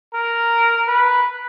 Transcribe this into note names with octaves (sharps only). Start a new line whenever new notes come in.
A#4
B4